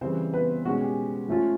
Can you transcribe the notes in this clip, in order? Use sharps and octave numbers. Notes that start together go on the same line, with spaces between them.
C#3 E3 G3 C4 C5
B3 B4
B2 G#3 C#4 F#4
G4
F3 A3 C#4 F4